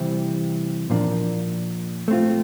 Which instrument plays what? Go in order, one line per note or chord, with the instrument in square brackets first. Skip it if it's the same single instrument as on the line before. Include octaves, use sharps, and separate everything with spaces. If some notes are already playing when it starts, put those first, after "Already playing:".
Already playing: [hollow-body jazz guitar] C3 E3 G3 C4 E4
A#2 F3 A#3 D4
A3 C4 F4